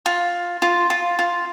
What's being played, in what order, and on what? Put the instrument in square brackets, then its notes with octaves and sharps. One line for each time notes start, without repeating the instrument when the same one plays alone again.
[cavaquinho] F4
F4
F4
F4